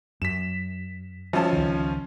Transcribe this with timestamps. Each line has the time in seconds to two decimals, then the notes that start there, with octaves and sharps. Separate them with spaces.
0.22 F#2 B6 E7
1.33 G#1 F3 C#4 A5
1.53 C#2 D#3